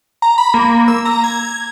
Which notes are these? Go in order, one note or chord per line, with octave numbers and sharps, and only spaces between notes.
A#5
B5
A#3
E6
A#5
G#6